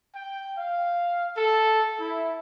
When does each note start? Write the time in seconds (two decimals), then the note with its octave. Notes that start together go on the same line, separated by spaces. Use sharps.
0.16 G5
0.58 F5
1.38 A4
2.00 E4